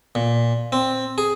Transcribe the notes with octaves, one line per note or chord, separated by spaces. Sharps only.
A#2
C4
G#4